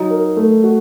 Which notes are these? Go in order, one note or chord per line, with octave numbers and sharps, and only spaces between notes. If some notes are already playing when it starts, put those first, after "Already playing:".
Already playing: F#3 D#4
A#4
A3
F#4